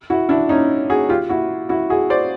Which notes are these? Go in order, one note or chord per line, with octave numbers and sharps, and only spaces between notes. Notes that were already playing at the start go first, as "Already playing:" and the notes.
E4 F#4
D4 E4
C#4 D#4
F#4 G#4
F4 G4
E4 F#4
E4 F#4
F#4 G#4
C5 D5